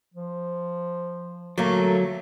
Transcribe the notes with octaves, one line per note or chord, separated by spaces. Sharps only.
F3
D3 F#3 A3 A#3